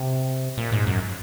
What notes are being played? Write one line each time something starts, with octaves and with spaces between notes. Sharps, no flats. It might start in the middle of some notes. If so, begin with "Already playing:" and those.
Already playing: C3
A#2
G#2
F#2